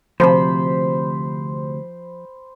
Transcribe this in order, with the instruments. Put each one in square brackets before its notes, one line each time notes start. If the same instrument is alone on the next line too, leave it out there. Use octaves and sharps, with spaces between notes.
[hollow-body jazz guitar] D2 C3 [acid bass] F3 [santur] C5 B5